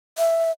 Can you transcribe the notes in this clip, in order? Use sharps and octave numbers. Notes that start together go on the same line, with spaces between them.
E5